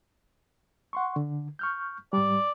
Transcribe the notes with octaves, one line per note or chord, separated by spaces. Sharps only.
F#5 C6 C#6
D3
C#6 F6 G6
G#2 G3 D5